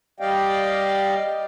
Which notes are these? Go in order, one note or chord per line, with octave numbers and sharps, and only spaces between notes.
G3 G4 D5 D#5 F5 G5